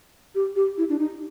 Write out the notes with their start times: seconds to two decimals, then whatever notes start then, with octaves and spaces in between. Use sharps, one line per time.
0.35 G4
0.56 G4
0.78 E4
0.89 D4
0.99 D#4